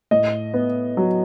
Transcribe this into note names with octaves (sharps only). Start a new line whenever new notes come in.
A2 D#5
B3
F#3